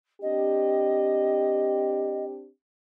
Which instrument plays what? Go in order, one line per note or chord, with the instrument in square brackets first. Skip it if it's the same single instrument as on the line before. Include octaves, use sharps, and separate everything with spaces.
[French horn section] C4 D4 G4 [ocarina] D#5